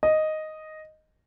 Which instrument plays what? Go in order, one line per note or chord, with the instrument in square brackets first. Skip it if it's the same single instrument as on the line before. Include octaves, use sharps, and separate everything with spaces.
[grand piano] D#5